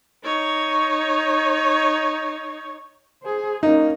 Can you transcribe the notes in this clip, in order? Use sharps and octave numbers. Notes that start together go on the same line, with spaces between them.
D#4 C#5
G#4 C5
A#3 C#4 D#4